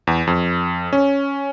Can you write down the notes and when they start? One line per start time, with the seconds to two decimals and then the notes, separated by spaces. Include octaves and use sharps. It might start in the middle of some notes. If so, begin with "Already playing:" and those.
0.07 E2
0.27 F2
0.93 C#4